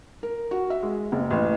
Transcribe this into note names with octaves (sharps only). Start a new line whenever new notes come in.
A#4
F#4
E5
G#3
F#1
A1